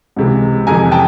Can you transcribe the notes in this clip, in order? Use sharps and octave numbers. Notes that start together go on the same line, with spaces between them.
C#2 C3 E3
F2 C3 E3 G#5 A#5
G5 A5